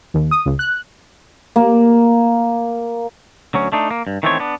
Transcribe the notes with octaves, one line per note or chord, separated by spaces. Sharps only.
D#2
D#6
C#2
F#6
A#3
D2 F#3 C#4
A3 D4 D#4
A#3
G2
D#3 E3 A3 B3 C4 C#5
B3 D4